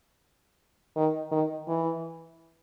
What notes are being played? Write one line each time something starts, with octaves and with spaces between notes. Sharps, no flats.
D#3
D#3
E3